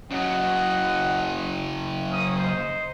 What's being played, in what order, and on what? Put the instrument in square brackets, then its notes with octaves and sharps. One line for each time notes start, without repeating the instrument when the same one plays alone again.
[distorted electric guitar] C#3 F#3 [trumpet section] D#5 F#5
[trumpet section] A#3 C#4 D#6
D#4 C5